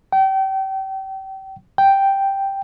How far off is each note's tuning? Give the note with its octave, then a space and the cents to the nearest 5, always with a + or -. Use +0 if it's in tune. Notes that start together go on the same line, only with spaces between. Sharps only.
G5 -30
G5 +0